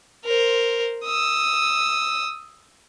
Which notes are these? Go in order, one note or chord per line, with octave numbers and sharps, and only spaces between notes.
A#4 C5
D#6 E6